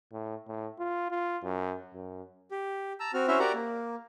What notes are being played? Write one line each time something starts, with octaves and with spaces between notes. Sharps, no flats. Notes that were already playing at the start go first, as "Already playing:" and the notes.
A2
A2
F4
F4
F#2
F#2
G4
A5 A#5 E6
C4 F#4 F6
C#4 E4 F#4 C5 E5 F6
F#4 G4 A#4 D5 F#5 A#5
A#3